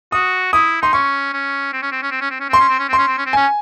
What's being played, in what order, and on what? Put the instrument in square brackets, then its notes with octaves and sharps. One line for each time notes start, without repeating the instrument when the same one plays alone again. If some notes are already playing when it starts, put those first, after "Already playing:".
[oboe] F#4 [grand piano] D#6
[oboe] E4 [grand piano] D#6
[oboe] D#4 [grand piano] C6
[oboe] C#4 [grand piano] C#6
[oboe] C#4
C4
C#4
C4
C#4
C4
C#4
C4
C#4
[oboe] C4 [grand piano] C6
[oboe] C#4
C4
C#4
[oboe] C4 [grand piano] C6
[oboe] C#4
C4
C#4
C4
[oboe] C#4 [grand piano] G#5